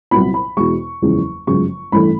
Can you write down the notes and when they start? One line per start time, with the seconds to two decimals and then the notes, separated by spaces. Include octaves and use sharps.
0.11 C2 A#2 F#3 B3 E4 B5
0.34 B5
0.57 E2 B2 G#3 C#6
1.02 F#1 E2 C#3 F3 G#3
1.47 G1 F#2 C#3 F3 G#3 C#6
1.92 A1 G2 E3 A3 B5